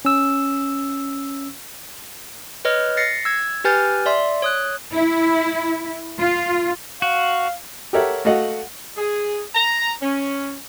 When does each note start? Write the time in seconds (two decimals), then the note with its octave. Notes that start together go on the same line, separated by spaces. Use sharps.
0.05 C#4 E6
2.65 B4 C#5 D#5 F6
2.97 A6 A#6 C7 C#7
3.25 E6 G#6
3.64 G4 B4 G#5 F6 G6 A6
4.06 D5 E5 C6
4.42 C#5 D#6 F#6
4.94 E4
6.19 F4
7.02 F#4 F5
7.93 G4 A4 A#4 C#5 E5 F#5
8.25 A3 F#4 D#5 F5 F#5
8.97 G#4
9.55 A#5
10.02 C#4